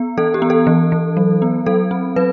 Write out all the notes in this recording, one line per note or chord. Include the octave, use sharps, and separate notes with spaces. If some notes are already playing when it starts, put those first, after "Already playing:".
Already playing: B3
E3 A4
G4
B3
A4
E3
E3
F#3
B3
F#3 A4
C4
F#3 B4